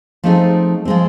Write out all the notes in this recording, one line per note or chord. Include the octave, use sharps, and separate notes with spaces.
F3 A3 C4 D#4 G#4
F3 G#3 C4